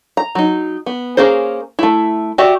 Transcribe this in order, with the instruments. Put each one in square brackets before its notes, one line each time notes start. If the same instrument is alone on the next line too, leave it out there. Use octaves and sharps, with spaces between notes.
[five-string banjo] A#5
F#3 D#4
B3
A#3 C#4 G#4 A#4 C5
A3 E4
F#4 G4 D5 E5